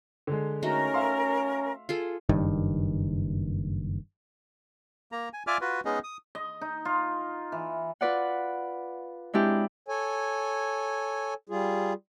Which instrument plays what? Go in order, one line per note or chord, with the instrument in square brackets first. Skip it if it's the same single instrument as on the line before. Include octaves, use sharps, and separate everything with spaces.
[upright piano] D3 G#3
[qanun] A3 D#4 F#4 [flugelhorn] C#4 [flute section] A#4
[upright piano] E5 F5 C6
[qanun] F4 G#4 A4
[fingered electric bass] F#1 G2 D#3
[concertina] A#3 A#5
G#5
F4 D5 E5 G#5 D6 F6
F4 F#4 B4
G#3 B3 C#4 D#4 G#4 D#5
D#6
[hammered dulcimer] D#5
D#4
F4
E3
[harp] F4 B4 D5 F#5
G#3 C4 D4 E4 G4
[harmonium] A4 C#5 G#5
G3 F4 G#4